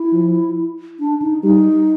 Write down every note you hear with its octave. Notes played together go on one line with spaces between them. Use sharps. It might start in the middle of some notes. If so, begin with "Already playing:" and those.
Already playing: E4
F3
D4
D#4
G3 D#4